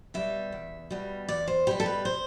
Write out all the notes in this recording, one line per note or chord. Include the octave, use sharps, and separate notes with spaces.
B2 G3 E5
E2
B2 G3
E2 D5
C5
B2 G3 G4
A4
B4
C5